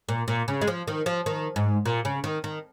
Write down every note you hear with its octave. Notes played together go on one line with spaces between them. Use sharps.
A#2
A#2
C#3
G#3
F3
D#3
F3
D#3
G#2
A#2
C#3
D#3
D#3